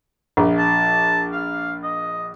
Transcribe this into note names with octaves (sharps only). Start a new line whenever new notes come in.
A#1
A5
F5
D#5